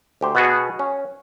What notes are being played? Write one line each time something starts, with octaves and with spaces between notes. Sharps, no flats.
D2 G4 C5
B2 B3 F#4 G#4
C#4